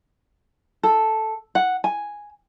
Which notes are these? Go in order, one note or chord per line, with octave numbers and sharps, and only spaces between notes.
A4
F#5
G#5